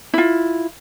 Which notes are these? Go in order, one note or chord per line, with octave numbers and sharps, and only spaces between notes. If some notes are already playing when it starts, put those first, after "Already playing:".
E4 F4